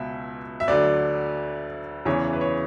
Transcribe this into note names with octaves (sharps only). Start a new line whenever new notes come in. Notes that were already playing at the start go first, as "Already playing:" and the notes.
Already playing: C#2 B2 F#3 E5
E5
D2 D3 F#3 D5
E2 C#3 E3 C#5
B4
C#5